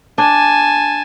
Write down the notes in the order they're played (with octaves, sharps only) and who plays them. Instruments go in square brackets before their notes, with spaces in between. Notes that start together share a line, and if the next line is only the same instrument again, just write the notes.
[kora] D4 [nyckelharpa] G#5 A5